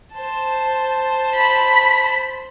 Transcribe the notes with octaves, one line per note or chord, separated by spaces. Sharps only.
C5 A5
B5